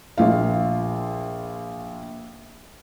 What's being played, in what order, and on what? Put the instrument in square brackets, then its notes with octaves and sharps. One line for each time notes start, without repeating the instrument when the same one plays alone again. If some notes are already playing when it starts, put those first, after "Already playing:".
[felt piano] A#1 F4 F5